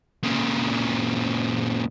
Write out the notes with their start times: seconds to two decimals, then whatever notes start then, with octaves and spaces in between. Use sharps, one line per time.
0.23 A#2 C#3